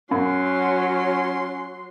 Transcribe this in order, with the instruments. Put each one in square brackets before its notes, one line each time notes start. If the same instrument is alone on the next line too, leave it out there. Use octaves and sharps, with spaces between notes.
[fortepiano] F#2 [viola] F#3 C6 [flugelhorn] C#4